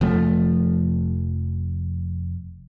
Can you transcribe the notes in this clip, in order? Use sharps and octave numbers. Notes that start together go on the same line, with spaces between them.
F1 F3 A3